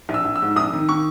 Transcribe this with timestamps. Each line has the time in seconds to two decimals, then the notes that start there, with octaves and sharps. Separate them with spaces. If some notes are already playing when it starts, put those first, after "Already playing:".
0.09 A#1
0.14 E6
0.25 A#1
0.35 E6
0.41 G#2
0.56 A#1 D#6
0.73 D#3
0.89 D#3 C#6